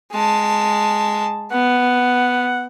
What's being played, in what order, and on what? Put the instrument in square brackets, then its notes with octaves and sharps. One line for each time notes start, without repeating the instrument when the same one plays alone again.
[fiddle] G#3 A5
[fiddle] B3 [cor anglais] F#5